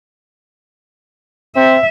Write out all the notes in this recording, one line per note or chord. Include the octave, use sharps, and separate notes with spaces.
C4 E5